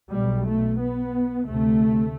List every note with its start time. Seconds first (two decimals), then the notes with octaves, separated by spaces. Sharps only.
0.12 B1 B2 G3
0.45 A3
0.80 B3
1.47 D2 C3 A3